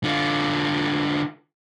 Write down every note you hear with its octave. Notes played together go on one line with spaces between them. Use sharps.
D3 F4